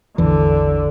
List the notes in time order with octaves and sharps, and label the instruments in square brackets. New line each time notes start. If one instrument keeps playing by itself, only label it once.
[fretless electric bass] A1 E2 E3 [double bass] D3